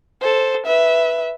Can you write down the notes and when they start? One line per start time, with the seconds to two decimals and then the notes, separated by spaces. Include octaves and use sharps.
0.21 A4 C5
0.66 B4 E5